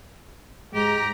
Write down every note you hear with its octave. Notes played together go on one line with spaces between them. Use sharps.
G#2 G#3 G4 A#5 A#6